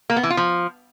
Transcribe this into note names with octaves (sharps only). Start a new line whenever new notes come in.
A#3
B3
E3
F4
F3